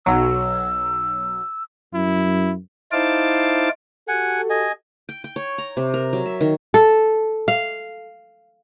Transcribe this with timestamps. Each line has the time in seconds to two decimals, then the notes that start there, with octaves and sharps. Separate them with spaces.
0.06 B1 F#3 E6
1.94 F#2 E4
2.92 D#4 E4 C5 F5 A5 D6
4.08 F#4 G4 A4 F#5 G#5
4.50 D#5 G#5
5.09 G5
5.24 G5
5.36 C#5
5.58 A#5
5.77 C3
5.94 A#4
6.13 F#3
6.26 E5
6.41 D#3
6.74 A4
7.48 F5